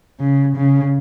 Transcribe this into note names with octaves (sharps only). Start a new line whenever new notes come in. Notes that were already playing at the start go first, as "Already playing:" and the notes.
C#3
C#3